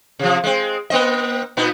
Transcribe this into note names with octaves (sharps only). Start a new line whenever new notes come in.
C3 F3
G#3 C4
A#3 C4 D#5
A#2 B3 D#4